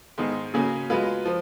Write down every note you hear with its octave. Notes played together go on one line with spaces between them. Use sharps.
G#2 D#3 G#3 B3 D#4 G#4
C#3 F#3 A#3 C#4 G#4
F#3 G#3 B3 F4 B4
F3